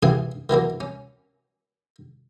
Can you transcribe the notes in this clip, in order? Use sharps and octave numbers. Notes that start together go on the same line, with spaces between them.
A1 C#3 E3 F5 G#5 D#6
D#3 E3 F#3 A#3
C#4